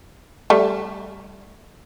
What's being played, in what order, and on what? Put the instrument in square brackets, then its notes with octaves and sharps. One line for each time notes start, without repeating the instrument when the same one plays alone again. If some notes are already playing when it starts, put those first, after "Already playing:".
[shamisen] G3 A3